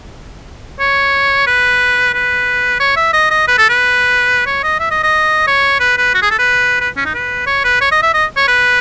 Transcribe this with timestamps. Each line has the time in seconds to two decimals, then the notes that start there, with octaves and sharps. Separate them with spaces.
0.80 C#5
1.47 B4
2.14 B4
2.80 C#5
2.96 E5
3.13 D#5
3.30 D#5
3.48 B4
3.58 A4
3.69 B4
4.46 C#5
4.63 D#5
4.80 E5
4.91 D#5
5.03 D#5
5.47 C#5
5.80 B4
5.98 B4
6.14 F#4
6.22 G#4
6.31 A4
6.39 B4
6.80 B4
6.97 C#4
7.05 D#4
7.14 B4
7.47 C#5
7.64 B4
7.81 C#5
7.92 D#5
8.03 E5
8.14 D#5
8.37 C#5
8.48 B4